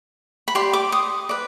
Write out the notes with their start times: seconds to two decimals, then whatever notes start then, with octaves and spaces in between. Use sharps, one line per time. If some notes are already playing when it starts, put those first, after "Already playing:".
0.48 B5
0.55 G4 D5 C6
0.73 D6
0.92 D#6
1.29 B4 D5